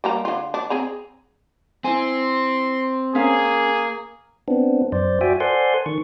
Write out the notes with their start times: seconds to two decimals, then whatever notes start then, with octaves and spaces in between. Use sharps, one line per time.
0.04 G3 A#3 A#5
0.25 D3 F4
0.54 D4
0.70 C4 G#4 A#5
1.84 C4 E4 G#5 C6
3.15 A#3 C#4 G#4 F5
4.48 B3 C4 D4
4.92 F#2 C5 D5
5.21 F#4 D5 E5 G5 G#5
5.40 A4 C5 D5 F#5 G#5 C6
5.86 D#3 C#6